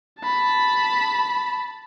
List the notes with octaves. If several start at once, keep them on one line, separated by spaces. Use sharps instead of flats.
A5 B5